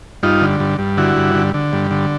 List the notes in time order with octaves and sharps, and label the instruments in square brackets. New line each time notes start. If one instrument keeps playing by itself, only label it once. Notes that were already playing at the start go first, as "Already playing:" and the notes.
[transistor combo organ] G2 D#4 F4
D3
G2
G2
D3 E4 F#4
G2
D3
D3
G2
D3